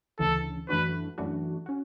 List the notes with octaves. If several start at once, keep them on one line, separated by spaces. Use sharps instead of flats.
D2 C#3 E3 A4
F#2 E3 A3 D4 F#4 B4
F#2 E3 A3 D4 F#4
C#4 F#4